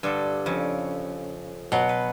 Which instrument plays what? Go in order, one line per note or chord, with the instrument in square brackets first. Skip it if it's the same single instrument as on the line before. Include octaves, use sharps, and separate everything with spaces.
[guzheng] G2 D3 A4
F2 C#3
[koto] B2 F#3 [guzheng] F#5
[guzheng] B4